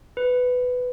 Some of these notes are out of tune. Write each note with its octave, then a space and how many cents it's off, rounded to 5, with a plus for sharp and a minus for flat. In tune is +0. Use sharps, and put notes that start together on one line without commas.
B4 +10